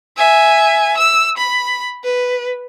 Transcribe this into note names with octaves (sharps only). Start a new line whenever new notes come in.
E5 G#5
E6
B5
B4